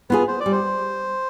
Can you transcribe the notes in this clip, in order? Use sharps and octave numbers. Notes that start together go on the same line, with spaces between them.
B3 F4 G#4 B4
C5
D5
G3
C5